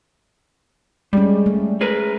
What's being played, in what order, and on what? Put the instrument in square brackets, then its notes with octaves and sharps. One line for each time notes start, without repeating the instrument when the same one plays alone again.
[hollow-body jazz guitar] G3 [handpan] G#3 C#4
[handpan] A3
[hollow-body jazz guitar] G#4 A#4 B4